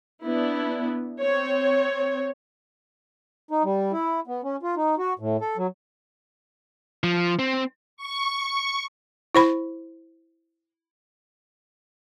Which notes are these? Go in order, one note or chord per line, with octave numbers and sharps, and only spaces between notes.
B3 D4 E4
C4 C#5
D#4
G3
E4
B3
C#4
F4
D#4
F#4
A2
A4
F#3
F3
C4
C#6
E4 C5 B5